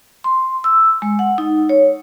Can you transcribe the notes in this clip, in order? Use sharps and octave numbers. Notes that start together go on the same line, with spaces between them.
C6
E6
G#3
F#5
D#4
C#5